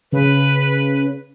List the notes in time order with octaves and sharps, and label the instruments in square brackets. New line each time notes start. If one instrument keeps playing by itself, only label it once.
[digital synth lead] C#3 [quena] B4